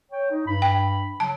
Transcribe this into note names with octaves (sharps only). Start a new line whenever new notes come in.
C#5 G5
D#4
G2 B5
G5
C#3 F#3 A5